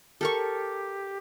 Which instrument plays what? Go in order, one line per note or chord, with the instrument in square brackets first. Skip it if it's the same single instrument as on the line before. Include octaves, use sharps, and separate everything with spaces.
[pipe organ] G4 [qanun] A4 A#4 C#6